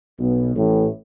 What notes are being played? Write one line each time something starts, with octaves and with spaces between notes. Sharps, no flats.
B1 B2
A1 A2